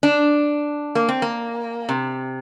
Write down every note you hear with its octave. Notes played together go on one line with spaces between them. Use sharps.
D4
A#3
C4
A#3
C3